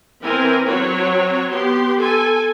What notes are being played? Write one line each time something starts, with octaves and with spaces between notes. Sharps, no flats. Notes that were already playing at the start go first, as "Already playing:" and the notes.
E3 C4 A#4 G#5
F#3 C4 F#4 C#5
B3 G4 C6
A4 G#5